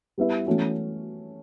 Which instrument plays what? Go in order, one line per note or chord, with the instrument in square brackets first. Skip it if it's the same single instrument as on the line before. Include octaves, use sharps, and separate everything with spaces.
[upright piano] G3 B3 E4 B4 E5
E3 A3 C#4 F#4